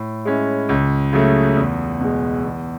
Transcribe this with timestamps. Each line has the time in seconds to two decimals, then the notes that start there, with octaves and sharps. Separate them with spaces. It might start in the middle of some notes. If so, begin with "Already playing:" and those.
Already playing: A2
0.25 G#3 C#4 E4
0.69 C#2
1.13 C#3 F#3 A3
1.57 E2
2.00 B2 G#3
2.44 E2